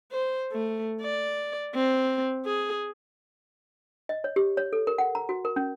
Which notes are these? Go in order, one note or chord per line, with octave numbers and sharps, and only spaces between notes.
C5
A3
D5
C4
G#4
D#5
C#5
G4
C#5
A4
A#4
F#5
A#5
F#4
A#4
C#4